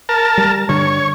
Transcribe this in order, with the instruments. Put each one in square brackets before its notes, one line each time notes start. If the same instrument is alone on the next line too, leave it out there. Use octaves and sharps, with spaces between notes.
[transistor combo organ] A#4 A5
[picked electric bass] G3
[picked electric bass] G2 D3 [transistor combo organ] C#5